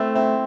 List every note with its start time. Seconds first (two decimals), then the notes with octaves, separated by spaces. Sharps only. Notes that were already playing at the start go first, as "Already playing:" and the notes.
Already playing: A3 C4 E4
0.15 C4 E4